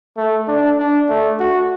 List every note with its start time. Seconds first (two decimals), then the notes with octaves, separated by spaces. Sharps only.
0.17 A3
0.48 D4
0.78 D4
1.09 A3
1.40 F#4